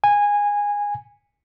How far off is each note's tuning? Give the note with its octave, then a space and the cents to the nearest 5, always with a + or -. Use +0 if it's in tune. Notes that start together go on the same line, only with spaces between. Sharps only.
G#5 -15